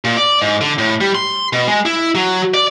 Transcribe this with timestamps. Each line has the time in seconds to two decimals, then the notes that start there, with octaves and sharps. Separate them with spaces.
0.05 A#2
0.17 D5
0.42 G#2
0.61 D3
0.79 A2
1.01 G3
1.15 C6
1.53 B2
1.68 G#3
1.86 E4
2.15 F#3
2.54 D5